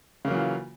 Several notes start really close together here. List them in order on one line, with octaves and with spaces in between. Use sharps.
C#3 A#3 F#3 E3 F4